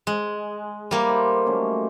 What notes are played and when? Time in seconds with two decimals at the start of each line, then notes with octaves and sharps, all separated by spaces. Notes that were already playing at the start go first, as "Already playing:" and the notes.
0.07 G#3
0.91 G3 A#3 E4 A4
1.09 D#4 C5
1.46 F#3 A3 C#4